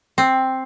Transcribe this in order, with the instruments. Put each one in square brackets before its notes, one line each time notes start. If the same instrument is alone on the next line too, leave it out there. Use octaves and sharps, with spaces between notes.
[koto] C4